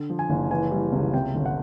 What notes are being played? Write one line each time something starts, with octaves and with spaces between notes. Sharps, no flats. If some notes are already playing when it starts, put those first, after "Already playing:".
Already playing: D3
F3
G#5
F#1
E3 G#5
G3
C#2
C3 G5
G1
F#5